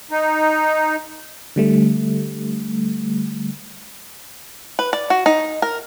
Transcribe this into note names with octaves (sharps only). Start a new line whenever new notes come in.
D#4
D3 G3 A3
B4
D5
F#4
D#4
A#4